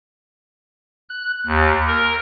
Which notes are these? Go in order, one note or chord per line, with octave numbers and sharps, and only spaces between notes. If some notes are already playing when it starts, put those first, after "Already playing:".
F#6
D#2
A#4